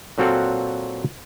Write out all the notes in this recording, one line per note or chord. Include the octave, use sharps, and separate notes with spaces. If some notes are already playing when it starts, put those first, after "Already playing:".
A#2 F#3 C4 F#4 A4 F5